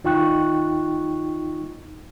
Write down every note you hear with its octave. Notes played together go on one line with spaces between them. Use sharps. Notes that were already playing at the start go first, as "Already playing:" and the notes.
D#2 D#4 F4 G5 C#6 F#6